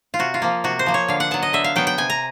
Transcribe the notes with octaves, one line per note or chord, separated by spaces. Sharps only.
F4
C3 F#4
F4
F3 A#3
C3 F#4
C5
F3 A#3
C#5
D3 F5
F#5
F#3 B3 A5
D#5
D3 E5
F5
F#3 B3 G5
G5
C3 G#5
A#5